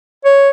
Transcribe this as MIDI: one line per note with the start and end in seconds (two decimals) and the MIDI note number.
0.25 0.50 73